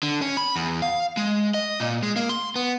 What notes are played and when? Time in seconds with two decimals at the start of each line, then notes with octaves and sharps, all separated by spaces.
0.03 D3
0.22 C#4
0.37 B5
0.56 E2
0.82 F5
1.17 G#3
1.54 D#5
1.80 A#2
2.03 G#3
2.16 A#3
2.29 C6
2.56 B3